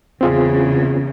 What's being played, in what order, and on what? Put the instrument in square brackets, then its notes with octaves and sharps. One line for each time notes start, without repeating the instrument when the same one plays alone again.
[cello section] E2 C#3 [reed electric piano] C4 F4 G#4